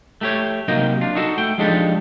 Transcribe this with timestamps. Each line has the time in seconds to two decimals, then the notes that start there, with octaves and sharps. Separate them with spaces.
0.21 A3 G4 C#5
0.68 C3 F#3 A#3 D#4 D#5 G5
1.01 D4 F4
1.15 D#4 F#4 A4
1.38 A3 G5
1.58 F3 G#3 D4 D#4 G4 A4